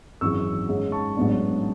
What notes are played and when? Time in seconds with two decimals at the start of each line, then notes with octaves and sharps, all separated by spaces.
0.21 G#1 F#2 E3 G#3 C#6 E6
0.68 G#2 G#3 C#4
0.92 A5 C#6
1.16 A1 G#2 F#3 B3 D4